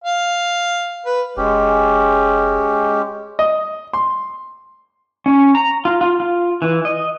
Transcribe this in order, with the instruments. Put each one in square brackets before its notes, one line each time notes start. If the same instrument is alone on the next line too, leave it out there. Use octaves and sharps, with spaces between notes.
[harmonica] F5
B4
[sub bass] F1 [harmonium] G#3 [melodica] C#4 G4
[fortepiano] D#5
C6
[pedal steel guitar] C#4
A#5
F4
F4
F4
E3
D#5